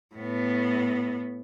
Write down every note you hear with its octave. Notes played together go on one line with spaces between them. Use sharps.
A2 B3